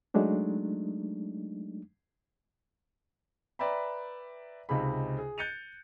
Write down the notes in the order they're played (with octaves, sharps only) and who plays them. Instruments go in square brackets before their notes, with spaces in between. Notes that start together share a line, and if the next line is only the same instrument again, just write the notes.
[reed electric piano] F#3 G#3 A3 D4 D#4
[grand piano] B4 D5 E5 G5 A#5 B5
C#2 C3 D#4 G#4 B5
G#4
F#6 G6 A6 C#7 D#7 F7